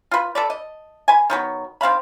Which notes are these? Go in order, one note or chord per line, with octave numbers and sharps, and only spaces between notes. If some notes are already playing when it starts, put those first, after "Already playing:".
F4 B4
A4 B4 D5
D#5
B4 G#5
D#3 F#3 B3
D#3 C4 F5 B5